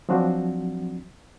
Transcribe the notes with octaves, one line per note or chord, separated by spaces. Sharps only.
F3 F#3 C4 D4 F#4